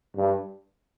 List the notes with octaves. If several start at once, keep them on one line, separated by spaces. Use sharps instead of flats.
G2